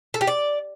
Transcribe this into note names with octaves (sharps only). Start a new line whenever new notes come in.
A4
G4
D5